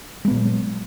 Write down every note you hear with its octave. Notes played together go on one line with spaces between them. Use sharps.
A#2 F#3 G#3 B3